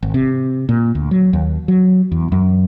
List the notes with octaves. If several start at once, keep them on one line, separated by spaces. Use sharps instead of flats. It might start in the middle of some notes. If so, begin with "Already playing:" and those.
G#1
C3
A#2
D2
F#3
D#2
F#3
E2
F#2